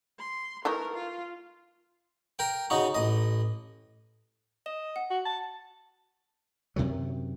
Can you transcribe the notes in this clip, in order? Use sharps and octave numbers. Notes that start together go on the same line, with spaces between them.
C6
E3 A3 D#4 A#4
F4
A#4 G5
C#3 D#4 F#4
A1 D#5
D#5 E7
F#5
F#4
A5
F#2 C3 D#3 F#3